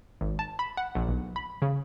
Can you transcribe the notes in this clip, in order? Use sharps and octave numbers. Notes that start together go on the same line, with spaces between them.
G#1
A5
B5
F#5
A#1
B1
B5
C#3